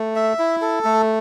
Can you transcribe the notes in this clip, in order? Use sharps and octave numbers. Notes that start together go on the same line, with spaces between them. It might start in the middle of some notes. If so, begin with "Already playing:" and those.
Already playing: A3
E5
E4
A4
A3